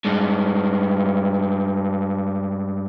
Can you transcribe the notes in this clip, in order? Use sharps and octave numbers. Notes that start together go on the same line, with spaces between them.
G2 G#3